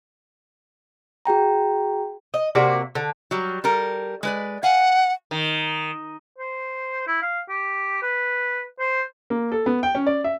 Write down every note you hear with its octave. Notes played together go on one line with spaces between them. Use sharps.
F#4 G#4 G5 A#5
D#5
C3 A#3 F#4 D5
D3
F#3 G3
G3 A4 A#4
G#3 B4 D5
F5 F#5 G#5
D#3
C5
E4
F5
G4
B4
C5
A#3
A4
B3
G5
C#4
D5
E5